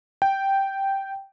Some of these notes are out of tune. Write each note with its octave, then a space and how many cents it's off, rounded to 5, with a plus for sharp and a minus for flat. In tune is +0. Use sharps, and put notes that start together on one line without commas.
G5 -5